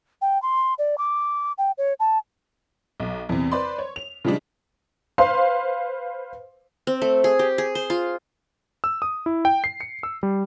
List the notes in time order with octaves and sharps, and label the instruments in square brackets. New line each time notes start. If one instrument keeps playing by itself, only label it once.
[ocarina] G5
C6
D5
D6
G5
C#5
A5
[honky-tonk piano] B1
E2 C3
B4 C5 D5 B5 C6
C#5
F7
C#3 F3 G3 G#3 D4
B4 C5 F5 C6
[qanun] C4
A3
G#4
G4
G#4
C5
F4
[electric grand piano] E6
D#6
E4
G5
C7
C#7
E6
G3